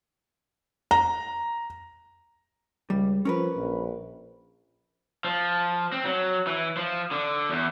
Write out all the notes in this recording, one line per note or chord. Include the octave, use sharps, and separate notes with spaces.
A#5
C#2 G3
F3 C#4 A#4 B4
A#1
F3
C4
F#3
E3
F3
D3
E2